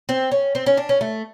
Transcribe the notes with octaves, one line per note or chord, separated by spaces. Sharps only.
C4
C#4
C4
C#4
D4
C#4
A3